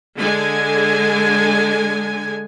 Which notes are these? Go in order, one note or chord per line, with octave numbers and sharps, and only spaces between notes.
D3 G#3 G#5